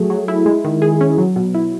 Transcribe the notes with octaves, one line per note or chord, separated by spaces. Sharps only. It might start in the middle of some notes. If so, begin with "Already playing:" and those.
Already playing: F#3 A3 G#4
F#3
E4
G#3
D#3
G#4
C#4
F#3
B2
E4